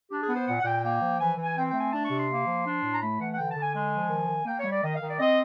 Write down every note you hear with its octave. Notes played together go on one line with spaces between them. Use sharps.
D4 G4
G#4
B3
C5
A#2 F#5
F#5
A#2 G5
A#3 G5
F3
E3 G#5
E3
G#5
C4 G5
G5
A3
G#5
D4 A5
C#6
C3
C6
A#3
F3
D4
A2
A#5
A3 B5
E3 F#5
F#5
D3 G5
A5
D3
G#5
G#3 G#5
F3
D#3
D#3
A#3 G5
C#5
G3
D5
D#3 D#5
F5
D#3
D5
C4 D#5